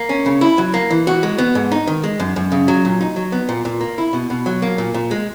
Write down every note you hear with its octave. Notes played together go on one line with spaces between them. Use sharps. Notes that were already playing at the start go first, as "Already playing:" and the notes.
Already playing: A#3
C#4
C#3
E4
F#3
A#3
E3
F#4
G#3
B3
G#2
D#4
D#3
G#3
F#2
F#2
C#3
F#3
A#2
D#4
F#3
B3
A#2
A#2
A#3
E4
B2
B2
F#3
A#3
A#2
A#2
G#3